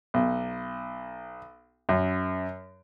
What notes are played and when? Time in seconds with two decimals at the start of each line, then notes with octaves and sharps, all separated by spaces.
0.14 B1
1.89 F#2